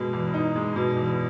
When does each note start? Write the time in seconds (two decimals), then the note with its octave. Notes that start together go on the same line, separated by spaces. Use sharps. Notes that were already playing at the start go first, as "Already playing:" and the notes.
Already playing: B2 G#3
0.13 E2
0.34 D#4
0.56 G#3
0.76 B2
0.97 E2